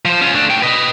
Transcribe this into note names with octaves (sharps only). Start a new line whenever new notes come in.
F3 C5
C#4 F4
A3 D4
A3 G5
B4 D#5